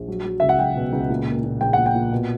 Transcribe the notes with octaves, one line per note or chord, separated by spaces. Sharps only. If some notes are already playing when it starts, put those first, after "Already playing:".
Already playing: A#1
F#3
F#3
C#2 E5
F#5
F#3 G5
B2
C#2
A#2
A#3
A#2
A#1 G5
F#5
A#2
G5
A#2
B2